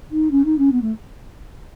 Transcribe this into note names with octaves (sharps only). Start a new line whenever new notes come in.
D#4
C#4
D#4
C#4
B3
A3